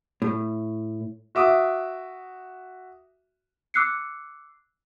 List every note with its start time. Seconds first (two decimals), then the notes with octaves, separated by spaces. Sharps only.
0.22 A2
1.35 F#4 E5 D6 D#6
3.74 D6 E6 F#6 C7 C#7